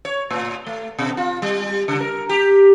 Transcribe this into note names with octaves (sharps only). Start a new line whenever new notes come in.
C#5
A2
A3
B2
F4
G3
C#3
A#4
G4